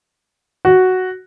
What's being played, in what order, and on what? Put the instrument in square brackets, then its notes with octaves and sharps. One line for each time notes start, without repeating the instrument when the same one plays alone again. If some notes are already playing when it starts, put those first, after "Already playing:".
[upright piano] F#4